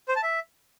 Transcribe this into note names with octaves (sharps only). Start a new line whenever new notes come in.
C5
A5
E5